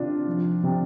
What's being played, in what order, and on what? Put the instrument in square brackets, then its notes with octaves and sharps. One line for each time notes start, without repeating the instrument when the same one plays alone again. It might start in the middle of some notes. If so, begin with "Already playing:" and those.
Already playing: [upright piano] C3 D#3 D4 F4
F3
C3